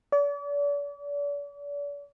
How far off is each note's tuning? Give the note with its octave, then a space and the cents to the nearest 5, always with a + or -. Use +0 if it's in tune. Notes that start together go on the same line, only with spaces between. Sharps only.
D5 -40